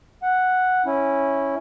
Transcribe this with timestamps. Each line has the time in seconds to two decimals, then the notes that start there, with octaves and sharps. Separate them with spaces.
0.23 F#5
0.86 C#4 E4